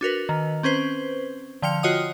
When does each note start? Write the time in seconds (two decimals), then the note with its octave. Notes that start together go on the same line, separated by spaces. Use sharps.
0.01 D4 F#4 A#4 B4
0.29 D#3
0.63 C4 C#4 B4 C5
1.62 D3 F3 G5 F6 C#7 F7
1.83 F4 F#4 C#5 D#5 F#5 D#6